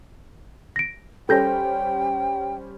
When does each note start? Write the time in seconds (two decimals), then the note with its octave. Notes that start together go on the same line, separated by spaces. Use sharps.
0.76 A#6 D7
1.29 G3 C#4 A4 C5 G5 G6 A#6